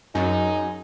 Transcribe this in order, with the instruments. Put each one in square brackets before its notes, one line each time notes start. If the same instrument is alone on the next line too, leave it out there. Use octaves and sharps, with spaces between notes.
[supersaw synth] F#2 [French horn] D#4 [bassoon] G#4